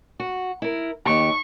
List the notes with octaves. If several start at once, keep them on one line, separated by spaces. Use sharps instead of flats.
F#4
E4 A#4
D#2 G4 C#6